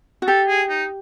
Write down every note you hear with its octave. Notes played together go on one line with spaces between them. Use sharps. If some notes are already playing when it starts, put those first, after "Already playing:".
F#4
G4 A4
G#4
D#4